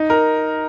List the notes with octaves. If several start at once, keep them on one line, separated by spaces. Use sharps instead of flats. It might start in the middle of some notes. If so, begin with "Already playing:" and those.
Already playing: D#4
A#4